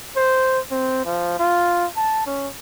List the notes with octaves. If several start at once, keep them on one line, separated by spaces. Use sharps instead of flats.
C5
C4
F3
F4
A5
C#4